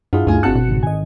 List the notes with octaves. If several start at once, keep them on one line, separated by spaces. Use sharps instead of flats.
G2 D4 E4 F4 G#4 F#5
D2 G2 A3 D#4 F4 G#5
G1 C4 F#4 A5 F#6 C#7
B2
G#1 G#2 C#3
G#1 D#5 G#5